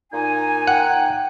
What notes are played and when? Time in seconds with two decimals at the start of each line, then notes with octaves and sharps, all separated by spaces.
0.12 A#2 D#4 G#5
0.67 F#5 G5